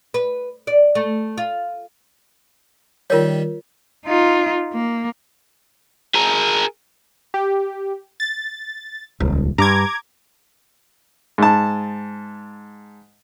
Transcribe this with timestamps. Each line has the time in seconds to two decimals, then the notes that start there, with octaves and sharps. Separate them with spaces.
0.14 B4
0.67 D5
0.95 A3
1.38 F4
3.10 D#3 G3 F4 A#4 C#5
4.06 D#4 F4
4.73 A#3
6.15 G#4 A#4
7.34 G4
8.20 A6
9.20 D#1 C#2
9.58 G2 A#5 D6 G#6
11.38 G#2 A5